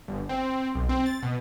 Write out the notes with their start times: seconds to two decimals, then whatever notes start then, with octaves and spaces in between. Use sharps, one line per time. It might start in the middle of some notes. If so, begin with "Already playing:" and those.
0.08 G1
0.29 C4
0.75 B1
0.89 C4
1.06 A6
1.23 B2